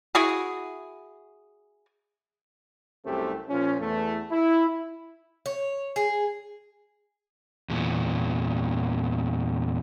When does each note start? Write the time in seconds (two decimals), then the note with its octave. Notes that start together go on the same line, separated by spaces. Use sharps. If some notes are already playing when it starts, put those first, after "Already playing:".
0.15 E4 F#4 G#4
3.04 C2 F#2 A3 C4 G4
3.49 A#2 F3 C#4
3.79 E2 A3
4.31 E4
5.46 C#5
5.96 G#4
7.70 E2 A#2